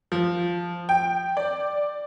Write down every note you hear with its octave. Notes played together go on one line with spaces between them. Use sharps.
F3
G5
D5